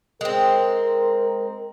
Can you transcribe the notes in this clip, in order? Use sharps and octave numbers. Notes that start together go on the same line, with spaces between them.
G#3 C4 A#4